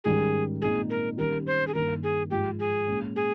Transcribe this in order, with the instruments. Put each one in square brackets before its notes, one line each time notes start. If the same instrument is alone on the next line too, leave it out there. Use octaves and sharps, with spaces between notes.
[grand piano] G#2 D#3 G3 C#4 [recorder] G#4
[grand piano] A#2 G#3 C4 D#4 [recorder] G#4
[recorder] A#4
[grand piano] D#3 G3 C#4 G4 [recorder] A#4
[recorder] C5
G#4
[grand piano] G2 D#3 A#3 [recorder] A#4
[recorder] G#4
[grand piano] G#2 F3 G#3 [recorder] G4
[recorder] G#4
[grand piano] A#2 G#3 C#4
[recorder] G#4